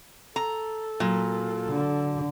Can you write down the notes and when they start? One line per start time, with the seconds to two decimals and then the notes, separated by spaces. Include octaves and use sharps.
0.36 A4 A#5
1.00 A#2 F#3
1.69 D3